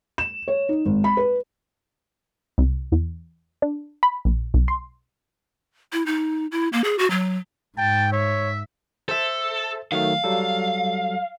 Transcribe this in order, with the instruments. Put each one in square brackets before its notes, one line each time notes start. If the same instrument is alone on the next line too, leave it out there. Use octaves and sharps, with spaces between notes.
[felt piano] E7
C#5
D#4
G#1
B5
B4
[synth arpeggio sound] C2
E2
D4
B5
A#1
B1
C6
[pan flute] E4
D#4
E4
A#3
G#4
F#4
F#3
[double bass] G#2 [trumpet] G5 [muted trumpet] A5
[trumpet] C#5 [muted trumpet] E5
[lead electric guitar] A4 [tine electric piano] C5 E5
[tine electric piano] D#3 F#3 A3 [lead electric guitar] F5
[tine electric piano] F#3 G3 A4